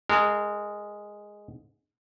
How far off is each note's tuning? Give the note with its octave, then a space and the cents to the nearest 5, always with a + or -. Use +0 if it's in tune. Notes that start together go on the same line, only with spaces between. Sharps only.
G#3 -5 A#4 -30